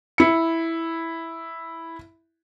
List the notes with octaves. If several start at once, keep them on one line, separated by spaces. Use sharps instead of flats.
E4 C#7